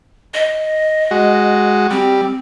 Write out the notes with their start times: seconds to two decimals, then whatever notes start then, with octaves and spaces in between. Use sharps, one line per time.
0.34 D#5
1.11 G#3 F#4
1.91 G3 C4